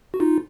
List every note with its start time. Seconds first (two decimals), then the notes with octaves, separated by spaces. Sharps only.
0.14 F#4
0.20 D#4 F4